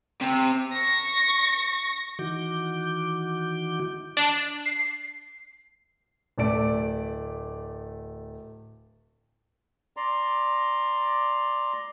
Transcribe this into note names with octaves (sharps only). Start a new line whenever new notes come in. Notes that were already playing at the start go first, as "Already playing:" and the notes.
C3
C#6 A#6
D#3 E3 F#4 D6 G6
D4
C7
D1 A3 D5 D7
D5 A#5 C6